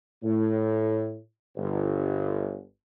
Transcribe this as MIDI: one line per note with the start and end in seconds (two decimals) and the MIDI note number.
0.23 1.17 45
1.57 2.60 31